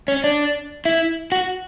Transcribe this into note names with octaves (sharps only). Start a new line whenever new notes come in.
C#4
D4
E4
F#4